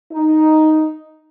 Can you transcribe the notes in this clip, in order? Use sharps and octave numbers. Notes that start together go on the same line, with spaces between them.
D#4